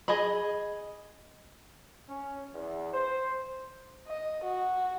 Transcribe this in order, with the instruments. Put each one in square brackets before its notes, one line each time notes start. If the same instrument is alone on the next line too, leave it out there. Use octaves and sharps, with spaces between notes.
[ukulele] G#4 D#5 B5
[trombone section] C#4
E2
C5
[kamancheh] D#5
F#4